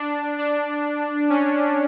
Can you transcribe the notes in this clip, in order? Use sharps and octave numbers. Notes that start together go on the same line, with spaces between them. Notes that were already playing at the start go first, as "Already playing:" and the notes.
Already playing: D4
D4
C#4